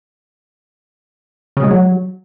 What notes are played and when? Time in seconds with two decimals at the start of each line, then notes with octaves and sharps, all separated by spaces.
1.57 C#3
1.64 G#3
1.71 F#3